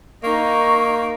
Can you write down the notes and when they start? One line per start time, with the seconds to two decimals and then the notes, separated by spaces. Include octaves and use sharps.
0.23 A#3 D#4 C#6